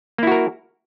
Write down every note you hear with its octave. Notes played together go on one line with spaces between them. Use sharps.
A#3 E4 F#4 A#4